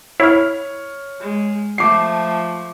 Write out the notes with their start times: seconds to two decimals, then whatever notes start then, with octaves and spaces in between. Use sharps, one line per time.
0.20 E4 C#5 F6
1.20 G#3
1.78 F3 A3 D6 C7